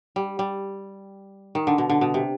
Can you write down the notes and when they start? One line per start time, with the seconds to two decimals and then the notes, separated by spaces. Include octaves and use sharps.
0.16 G3
0.39 G3
1.55 D#3
1.67 D3
1.78 B2
1.89 D3
2.01 B2
2.14 C3